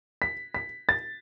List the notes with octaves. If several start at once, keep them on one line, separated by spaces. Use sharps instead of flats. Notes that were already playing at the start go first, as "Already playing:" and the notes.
B6
B6
A6